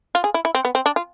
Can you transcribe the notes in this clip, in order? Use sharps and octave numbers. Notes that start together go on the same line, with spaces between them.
F4
G#4
E4
E4
C4
B3
C4
D4
F4